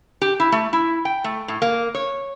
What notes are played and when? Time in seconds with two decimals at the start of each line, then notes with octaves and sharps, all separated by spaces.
0.22 G4
0.40 E4
0.52 A3
0.73 E4
1.05 G5
1.24 A3
1.48 A2
1.62 A#3
1.95 C#5